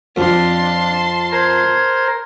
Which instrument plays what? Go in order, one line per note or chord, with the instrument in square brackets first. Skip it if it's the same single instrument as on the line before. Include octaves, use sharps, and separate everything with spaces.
[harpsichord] F2 [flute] D4 [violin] A5 C6
[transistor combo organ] A#4 C5 [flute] G#6